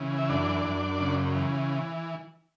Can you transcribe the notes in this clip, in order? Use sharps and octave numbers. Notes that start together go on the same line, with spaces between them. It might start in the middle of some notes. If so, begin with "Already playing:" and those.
Already playing: C#3 E3
E5
F#2 D4 D5
F#2
C#3
E3